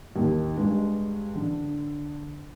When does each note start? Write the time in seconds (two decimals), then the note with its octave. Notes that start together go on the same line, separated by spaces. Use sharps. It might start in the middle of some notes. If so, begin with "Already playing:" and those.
0.16 D#2
0.57 G2 G#3
1.35 D3